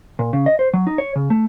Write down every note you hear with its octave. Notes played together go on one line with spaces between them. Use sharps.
A#2
C#3
D#5
C5
F#3
D#4
C#5
C#3
A3